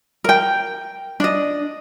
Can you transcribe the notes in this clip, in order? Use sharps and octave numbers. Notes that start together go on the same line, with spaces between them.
A#4 G5
D4 D#5